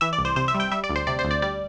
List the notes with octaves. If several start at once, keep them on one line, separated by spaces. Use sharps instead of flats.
E3 E5
D5
C2
C5
C3 C5
E5
G3
G5
G3 E5
D5
D2
C5
C3 D5
C5
D2
D5
G3 D5